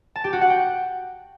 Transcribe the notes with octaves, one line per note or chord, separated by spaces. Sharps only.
A5
G4
F#4
F#5
G5